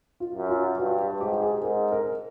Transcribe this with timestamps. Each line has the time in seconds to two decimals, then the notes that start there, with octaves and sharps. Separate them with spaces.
0.20 F4
0.35 F#2
0.49 F4
0.78 G2 F#4
0.99 G4
1.20 G#2 G4
1.32 G4
1.42 G#4
1.63 G#2 A#4
1.92 A#4